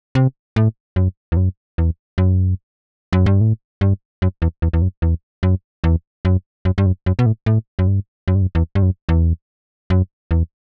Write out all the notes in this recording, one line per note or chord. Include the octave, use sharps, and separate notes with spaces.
C3
A2
F#2
E2
F#2
E2
F#2
F#2
G2
A2
G2
F#2
E2
E2
E2
F#2
E2
F#2
E2
F#2
F#2
G2
F#2
F#2
B2
A2
A2
F#2
G2
F#2
G2
F#2
E2
G2
F#2
E2
F#2
E2